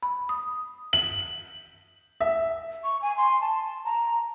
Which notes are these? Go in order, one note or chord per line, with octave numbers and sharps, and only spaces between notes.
B5
D#6
F#7
E5
C#6
G#5
C6
A5
A#5